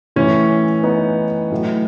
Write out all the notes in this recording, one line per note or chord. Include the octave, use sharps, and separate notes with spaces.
A2 E3 C#4
B3 D#4
A2 F#3